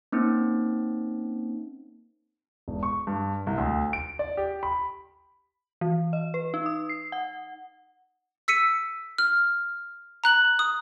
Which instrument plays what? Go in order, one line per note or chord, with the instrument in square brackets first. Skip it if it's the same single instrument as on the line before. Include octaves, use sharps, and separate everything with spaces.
[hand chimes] A#3 C4 C#4 D#4
[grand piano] E1
C#6
G2
C2
D2
D7
D5
G4
B5
[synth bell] E3
D#5
B4
D#4
D#6
C7
F#5
[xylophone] E6 B6 C#7 D#7
F6
A#5 F#6 F#7
D#6